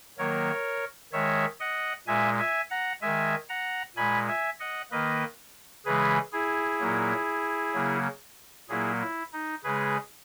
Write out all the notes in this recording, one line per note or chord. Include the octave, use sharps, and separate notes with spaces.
D#3 F#3 A#3 A#4 C#5
D#3 G#3 C#5 E5
D#5 F#5
A#2 G#3 E5 G#5
E5 G#5
F#5 A#5
D#3 G#3 E5 G#5
F#5 A#5
A#2 G#3 G#5 B5
E5 G#5
D#5 F#5
D#3 A#3 B4 D#5
C#3 E3 G#3 G#4 B4
E4 G#4
A#2 F#3 A#3
C#3 F#3 A#3
A#2 F#3 A#3 E4 G#4
E4
D#4
C#3 G#3 G#4 B4